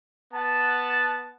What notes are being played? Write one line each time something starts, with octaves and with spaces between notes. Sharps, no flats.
B3 F#5 A5